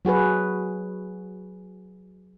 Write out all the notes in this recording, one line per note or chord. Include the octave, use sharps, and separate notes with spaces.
F#3 F#4 G#4 B4